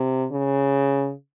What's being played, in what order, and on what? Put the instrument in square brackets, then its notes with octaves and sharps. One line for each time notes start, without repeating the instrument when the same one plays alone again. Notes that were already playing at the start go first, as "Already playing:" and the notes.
Already playing: [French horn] C3
C#3